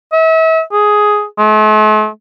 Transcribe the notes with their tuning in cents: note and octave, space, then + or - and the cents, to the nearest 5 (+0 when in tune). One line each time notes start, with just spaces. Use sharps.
E5 -40
G#4 +5
A3 -45